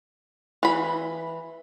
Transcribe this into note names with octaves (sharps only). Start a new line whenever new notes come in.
E3 B5